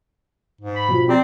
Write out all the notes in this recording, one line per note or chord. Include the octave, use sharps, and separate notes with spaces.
G#2
B5
B2 F3
C4 G4 D5 A#5